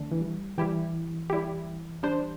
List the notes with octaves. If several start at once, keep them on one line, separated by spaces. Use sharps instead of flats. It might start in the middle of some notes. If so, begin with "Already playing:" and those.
Already playing: E2 D3 A3 D4
E3
G3
E3 G3 E4 G4
G3 E4 G4
G3 D4 C5